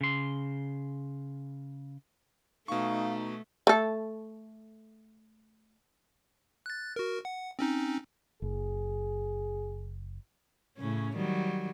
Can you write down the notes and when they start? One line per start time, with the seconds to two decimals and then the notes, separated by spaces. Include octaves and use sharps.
0.01 C#3 C6
2.68 B2 A3 D#4 F5 C#6
3.67 A3 A4
6.66 F#6 A6
6.96 F#4 A#4
7.25 F#5
7.59 C4 C#4 D#4
8.42 F#1 G#4
10.78 A2 C#3 C#4
11.16 D#3 F#3 G3